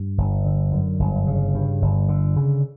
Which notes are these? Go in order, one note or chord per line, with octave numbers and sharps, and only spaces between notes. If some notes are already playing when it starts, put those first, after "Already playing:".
Already playing: G2
G1
D3
F#2
G1
C#3
G2
G1
D3
C#3